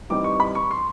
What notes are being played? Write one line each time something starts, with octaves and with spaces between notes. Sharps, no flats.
E3 G3 C4 D#4 D6
C#6
B5
C#6
C6